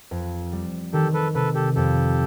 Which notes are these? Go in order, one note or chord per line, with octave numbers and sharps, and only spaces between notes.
F2
G3
D#3 G4 A4
A4 B4
C3 A4 B4
G4 A4
F2 G4 A4